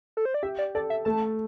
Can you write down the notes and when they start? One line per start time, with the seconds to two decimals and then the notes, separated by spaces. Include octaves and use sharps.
0.17 A4
0.25 C5
0.34 D5
0.43 G4 E5
0.59 D5
0.75 A4 D5
0.90 E5
1.05 A3 A5